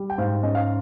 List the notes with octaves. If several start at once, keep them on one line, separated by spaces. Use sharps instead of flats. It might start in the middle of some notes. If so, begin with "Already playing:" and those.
Already playing: G3
G5
G#2 F5
C#4 D#5
F5